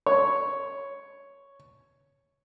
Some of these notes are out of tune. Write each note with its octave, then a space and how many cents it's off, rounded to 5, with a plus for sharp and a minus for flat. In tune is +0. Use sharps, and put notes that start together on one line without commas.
C#5 +0